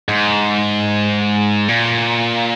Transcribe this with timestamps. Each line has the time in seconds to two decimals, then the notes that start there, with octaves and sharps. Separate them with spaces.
0.08 G#2
1.68 A#2